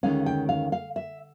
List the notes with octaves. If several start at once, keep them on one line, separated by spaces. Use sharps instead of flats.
D2 C3 D#3 G#3 C#4 F5
G5
F5
F5
E5